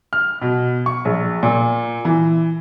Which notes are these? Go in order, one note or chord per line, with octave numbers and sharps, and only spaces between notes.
F6
B2
C#6
A#1
A#2
E3